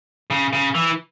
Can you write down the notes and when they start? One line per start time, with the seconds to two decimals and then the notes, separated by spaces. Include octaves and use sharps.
0.30 C#3
0.53 C#3
0.75 E3